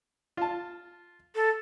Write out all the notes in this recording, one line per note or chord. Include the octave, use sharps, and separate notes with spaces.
F4 A5
A4